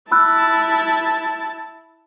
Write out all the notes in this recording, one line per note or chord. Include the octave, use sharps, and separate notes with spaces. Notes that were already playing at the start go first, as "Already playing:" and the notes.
E4 A5 B5 E6 F#6